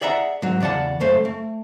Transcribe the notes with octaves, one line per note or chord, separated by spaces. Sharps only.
G#4 D5 E5 F#5 A#5
G#2 F#3
E2 C#3 D5 F#5 A5
C#2 F#2 A3 C5
A3